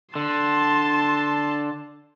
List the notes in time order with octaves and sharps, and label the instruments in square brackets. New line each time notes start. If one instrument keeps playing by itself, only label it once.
[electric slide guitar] D3 [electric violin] A5 C6